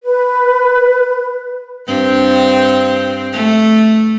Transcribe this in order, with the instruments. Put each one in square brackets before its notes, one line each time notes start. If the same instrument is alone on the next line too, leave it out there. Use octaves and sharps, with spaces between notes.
[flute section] B4
[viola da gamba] G2 C4
A3